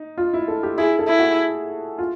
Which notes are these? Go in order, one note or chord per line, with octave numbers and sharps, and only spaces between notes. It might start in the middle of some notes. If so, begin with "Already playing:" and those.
Already playing: D#4
F4
E4
A4
G4
E4 G#4
A4
E4
F#4
F4